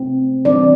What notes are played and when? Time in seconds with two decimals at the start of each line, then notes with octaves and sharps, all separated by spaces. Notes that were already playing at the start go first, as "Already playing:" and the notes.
Already playing: C3 A3 C4
0.45 E3 G3 C4 D4 D5